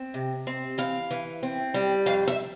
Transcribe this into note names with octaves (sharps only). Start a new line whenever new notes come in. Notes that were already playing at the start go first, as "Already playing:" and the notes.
Already playing: C4
C3
C4
E3 F5
E3
C4
G3
F2 F5
E5